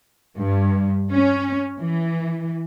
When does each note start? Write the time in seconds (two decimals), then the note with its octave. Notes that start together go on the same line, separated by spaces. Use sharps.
0.38 G2
1.13 C#4
1.80 E3